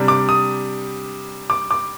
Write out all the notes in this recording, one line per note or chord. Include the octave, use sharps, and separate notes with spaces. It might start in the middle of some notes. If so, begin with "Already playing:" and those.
Already playing: C3 G3 D4
D6
D#6
D6
D6